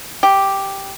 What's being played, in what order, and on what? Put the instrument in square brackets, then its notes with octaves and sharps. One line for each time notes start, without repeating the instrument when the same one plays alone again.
[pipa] G4